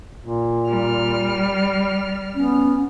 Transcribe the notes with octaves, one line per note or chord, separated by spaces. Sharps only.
A#2
G3 F6
B3 C#4